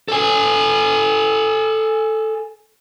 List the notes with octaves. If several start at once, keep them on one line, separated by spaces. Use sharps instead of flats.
A4 G#5